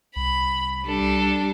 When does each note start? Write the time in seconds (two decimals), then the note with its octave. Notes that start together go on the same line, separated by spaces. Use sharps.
0.16 C2 B5
0.84 G3 D4 A4